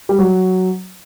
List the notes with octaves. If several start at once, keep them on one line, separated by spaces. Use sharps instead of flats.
G3
F#3